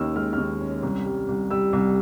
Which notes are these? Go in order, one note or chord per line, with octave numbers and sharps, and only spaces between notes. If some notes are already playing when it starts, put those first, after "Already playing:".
Already playing: D#2 D#3 C#4 E6 F6
G#3 F6
D#2 F6
C#4
C2
G3
C2
G3 E6
C2